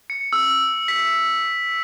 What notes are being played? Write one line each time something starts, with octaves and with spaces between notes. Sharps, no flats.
C#7
E6
B6